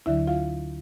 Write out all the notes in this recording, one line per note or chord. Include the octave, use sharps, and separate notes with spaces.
D2 D3 F#3 E4 E5
F4 F5